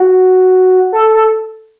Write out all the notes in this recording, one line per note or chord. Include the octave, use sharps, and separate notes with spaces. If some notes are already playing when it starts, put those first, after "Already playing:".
Already playing: F#4
A4
A4